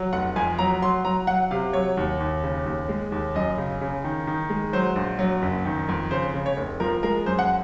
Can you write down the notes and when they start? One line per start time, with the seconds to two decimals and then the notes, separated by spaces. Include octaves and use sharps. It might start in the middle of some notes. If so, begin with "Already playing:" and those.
Already playing: F#3
0.13 F1 F#5
0.36 F2 G#5
0.59 F#3 A#5
0.82 F#3 C6
1.05 F#3 A#5
1.27 F#3 F#5
1.51 C3 F5
1.73 F#3 C#5
1.97 D#2
2.20 D#2
2.43 C#3
2.66 D#2
2.89 G#3
3.12 D#2
3.35 F#2 D#5
3.58 C#3
3.81 C#3
4.04 D#3
4.27 D#3
4.50 G#3
4.73 F#3 C5
4.96 A#1
5.19 F#3
5.42 F#1
5.65 D#3
5.89 F2
6.11 C#3 C5
6.34 C#3
6.46 C#5
6.57 F1
6.80 F3 A#4
7.03 G#3 A#4
7.26 F#2 C5
7.39 F#5